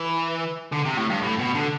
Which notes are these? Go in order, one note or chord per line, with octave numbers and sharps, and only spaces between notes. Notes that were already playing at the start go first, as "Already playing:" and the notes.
Already playing: E3
D3
C3
A2
G2
A2
B2
D3